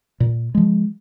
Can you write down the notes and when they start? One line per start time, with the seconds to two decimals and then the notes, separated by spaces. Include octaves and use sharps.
0.20 A#2
0.55 F3 G#3